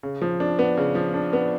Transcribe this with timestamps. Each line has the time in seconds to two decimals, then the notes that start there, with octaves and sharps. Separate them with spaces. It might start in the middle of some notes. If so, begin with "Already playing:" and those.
0.03 C#3
0.22 F3
0.40 D4
0.59 B3
0.77 C#3
0.95 F3
1.14 D4
1.33 B3